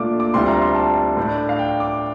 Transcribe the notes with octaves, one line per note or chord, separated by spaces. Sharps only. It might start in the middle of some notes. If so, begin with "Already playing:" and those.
Already playing: A#2 A3 D4 F4 D6
D6
D2 C3 G3 D4 F4 C6
A#5
C6
A5
A2 A3 D4
F5
G5
D6